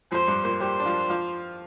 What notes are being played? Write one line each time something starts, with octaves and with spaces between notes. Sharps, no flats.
F2 F3 C5
G2 G3
A#2 A#3
G3 G4 C5
D4
F3 F4
F3 F4